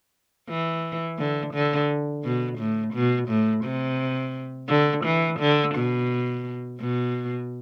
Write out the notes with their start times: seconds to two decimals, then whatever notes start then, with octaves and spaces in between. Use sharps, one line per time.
0.49 E3
1.18 D3
1.54 D3
2.24 B2
2.59 A2
2.94 B2
3.29 A2
3.64 C3
4.69 D3
5.05 E3
5.40 D3
5.75 B2
6.80 B2